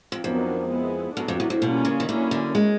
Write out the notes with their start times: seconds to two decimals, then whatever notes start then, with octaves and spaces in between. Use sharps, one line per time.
0.12 F2
0.24 F2 D#3 F#3 B3 D4
0.70 G#3 B3 E4
1.16 F#2 F#3 B3 D4 F#4 A4
1.28 F2
1.40 E2
1.50 F2
1.62 B2 G3 A#3 C#4 F4
1.85 C#3
2.00 D#3
2.09 D3 F#3 A#3 C#4 E4
2.31 D3
2.55 G#3